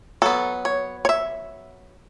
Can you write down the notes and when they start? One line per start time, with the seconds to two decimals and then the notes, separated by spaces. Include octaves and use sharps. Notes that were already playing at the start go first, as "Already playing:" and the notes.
0.22 F#3 B3 A4
0.65 C#5
1.05 C#5
1.09 E5